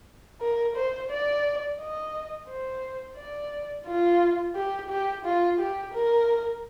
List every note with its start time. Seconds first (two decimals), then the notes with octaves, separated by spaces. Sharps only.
0.41 A#4
0.76 C5
1.10 D5
1.79 D#5
2.49 C5
3.17 D5
3.87 F4
4.55 G4
4.90 G4
5.25 F4
5.60 G4
5.94 A#4